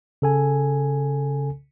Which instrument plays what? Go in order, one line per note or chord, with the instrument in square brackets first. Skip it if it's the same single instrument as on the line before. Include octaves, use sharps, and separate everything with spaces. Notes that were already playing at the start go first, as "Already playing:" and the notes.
[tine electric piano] C#3 A4 G#5